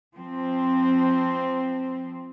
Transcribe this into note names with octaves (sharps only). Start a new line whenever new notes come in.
F3 C4